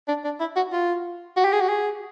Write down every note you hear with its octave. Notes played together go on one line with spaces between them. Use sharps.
D4
D4
E4
F#4
F4
F#4
G4
G#4
F#4
G#4